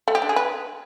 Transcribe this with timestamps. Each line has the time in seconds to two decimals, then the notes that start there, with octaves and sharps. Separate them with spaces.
0.08 A3
0.15 G4
0.22 D4
0.29 G#4
0.36 B4